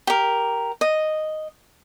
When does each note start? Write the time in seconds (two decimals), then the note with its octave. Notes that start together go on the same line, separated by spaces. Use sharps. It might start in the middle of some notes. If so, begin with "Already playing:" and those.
0.07 G4 A#4
0.81 D#5